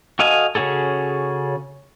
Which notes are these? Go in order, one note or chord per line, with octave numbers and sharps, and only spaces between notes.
F#4 A4 D#5 F5 G#5
C#3 C#4 F#4 G#4 A4